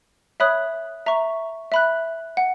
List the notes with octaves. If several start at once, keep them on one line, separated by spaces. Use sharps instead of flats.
C#5 E5 B5 D#6 F#6
E5 A#5 C#6
E5 B5 F#6
F#5